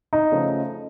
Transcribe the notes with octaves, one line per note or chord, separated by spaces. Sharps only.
D#4
C#3 F3 A3 C#4 F4